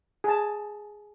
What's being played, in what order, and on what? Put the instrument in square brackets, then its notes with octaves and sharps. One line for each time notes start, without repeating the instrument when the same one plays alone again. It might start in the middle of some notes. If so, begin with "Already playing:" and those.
[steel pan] G#4 A5